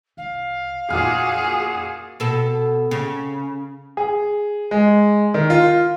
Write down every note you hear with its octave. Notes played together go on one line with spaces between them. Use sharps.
C2 F5
F2 A#2 C#4 F#4 G#4 F6
B2 A4
C#3
G#4
G#3
D#3
F4